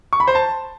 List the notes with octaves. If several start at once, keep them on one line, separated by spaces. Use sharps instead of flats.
C#6
B5
C5
A5